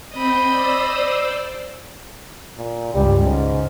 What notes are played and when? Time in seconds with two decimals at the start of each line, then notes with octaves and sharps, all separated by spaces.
0.13 C4 D#5 B5 G6
0.47 C5 D5 E6
2.57 A#2
2.94 C#2 G2 G3
3.23 G#2 C#3